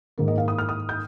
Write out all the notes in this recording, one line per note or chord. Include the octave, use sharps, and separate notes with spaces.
G#2 D#3 A#3
D#5
F5
D#6
F6
D#6
G6